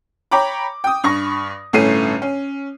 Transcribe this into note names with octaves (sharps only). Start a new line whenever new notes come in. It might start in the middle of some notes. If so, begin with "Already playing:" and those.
C#5 G5 A#5 B5 D6
G5 D#6
G2 C#6 A#6
G1 A2 A3 C#4 C7 D#7
C#4